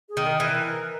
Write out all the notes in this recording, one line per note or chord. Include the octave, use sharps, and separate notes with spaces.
G#4
D#3
A#4
E3